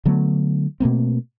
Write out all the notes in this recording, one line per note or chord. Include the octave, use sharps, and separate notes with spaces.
D3 F#3 A3 B3
B2 A3 A#3 C4